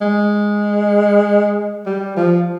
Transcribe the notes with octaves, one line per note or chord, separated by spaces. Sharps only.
G#3
G3
F3